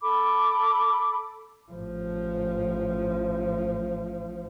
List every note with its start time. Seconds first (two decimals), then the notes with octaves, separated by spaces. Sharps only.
0.02 A4 B5 D6
1.72 A1 F3